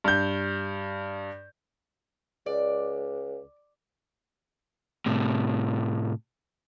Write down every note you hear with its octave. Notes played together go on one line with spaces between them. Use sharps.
G2 G6
C#2 D5
A2 C3